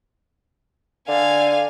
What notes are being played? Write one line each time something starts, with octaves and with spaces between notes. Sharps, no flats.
D3 F5 G#5